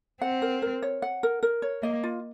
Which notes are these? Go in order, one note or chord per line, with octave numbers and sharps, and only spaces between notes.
C4 F#5
A#4
A#4
C#5
F#5
A#4
A#4
C#5
A#3 D#5
F4